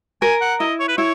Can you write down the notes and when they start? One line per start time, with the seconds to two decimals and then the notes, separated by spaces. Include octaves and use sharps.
0.22 A#4 G#5
0.41 F#5
0.60 E4 D#5
0.80 C#5
0.88 B4
0.98 E4 C#5